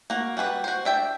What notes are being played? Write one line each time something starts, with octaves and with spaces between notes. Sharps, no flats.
A#3 F#4
G3 F#4 G#4 B4
F#4 C5
D4 E5 G5